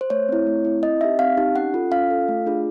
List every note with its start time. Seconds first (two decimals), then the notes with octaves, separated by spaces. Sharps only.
0.01 C5
0.10 A3 C#5
0.29 C4 E4
0.47 A3
0.65 C4 E4
0.83 C4 D#5
1.01 D#4 G4 E5
1.19 C4 F5
1.37 D#4 G4
1.55 C#4 F#5
1.74 F4 A4
1.91 C#4 F5
2.10 F4 A4
2.28 A3
2.46 D4 F4 G#4